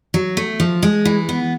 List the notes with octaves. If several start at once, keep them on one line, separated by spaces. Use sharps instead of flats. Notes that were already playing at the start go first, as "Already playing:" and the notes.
F#3
A3
F3
G#3
E3
B3